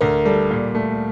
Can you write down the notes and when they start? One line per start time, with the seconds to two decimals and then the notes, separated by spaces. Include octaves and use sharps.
0.01 D2 A#4
0.25 G3 A4
0.50 A#2
0.75 A3